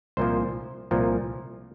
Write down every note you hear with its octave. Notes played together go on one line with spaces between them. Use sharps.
C2 A#2 F3 C5
C2 A#2 F3